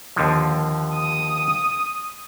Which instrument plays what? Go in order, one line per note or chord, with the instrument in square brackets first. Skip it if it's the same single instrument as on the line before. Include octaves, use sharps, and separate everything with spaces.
[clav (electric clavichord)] D#2 D3 F3
[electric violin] D#6